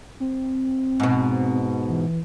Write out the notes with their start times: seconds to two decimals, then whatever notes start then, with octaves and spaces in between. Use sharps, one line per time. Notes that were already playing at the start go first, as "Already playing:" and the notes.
0.20 C4
1.00 G#2 B2
1.89 E3